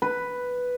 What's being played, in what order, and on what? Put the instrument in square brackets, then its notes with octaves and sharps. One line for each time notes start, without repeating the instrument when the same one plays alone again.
[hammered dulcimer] B4